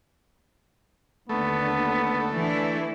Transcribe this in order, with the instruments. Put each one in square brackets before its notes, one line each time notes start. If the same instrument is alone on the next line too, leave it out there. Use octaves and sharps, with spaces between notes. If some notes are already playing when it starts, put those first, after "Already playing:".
[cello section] D#2 D3 [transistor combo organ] A3 [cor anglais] B3
[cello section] E3 D4 E4